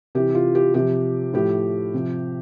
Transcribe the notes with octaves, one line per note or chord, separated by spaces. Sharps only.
C3 E3 G4
F4
G4
C3 F3 G4
A2 F3 G4
C3 F3